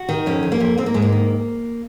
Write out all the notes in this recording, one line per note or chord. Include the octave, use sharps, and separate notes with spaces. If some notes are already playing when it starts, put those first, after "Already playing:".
Already playing: F#4
D#3
F2 C#4
F2
A#3
F2
G#2 C4
A#3
G#2 G#3
A#3
D#3